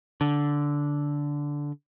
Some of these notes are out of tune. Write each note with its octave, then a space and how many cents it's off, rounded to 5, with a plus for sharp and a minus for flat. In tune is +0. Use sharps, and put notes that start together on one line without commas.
D3 -10